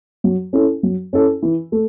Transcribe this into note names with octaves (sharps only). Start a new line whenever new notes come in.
F#3
C#4 E4 A4
F#3
C#4 E4 A4
E3
A3